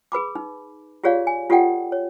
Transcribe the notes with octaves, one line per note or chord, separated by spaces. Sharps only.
G#4 B4 B5 D6
D#4
F4 G4 G#4 C#5 D5 F5
G#5
F4 G4 A4 D5 F#5 G5
C#5